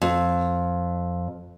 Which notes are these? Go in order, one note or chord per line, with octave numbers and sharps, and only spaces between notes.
F2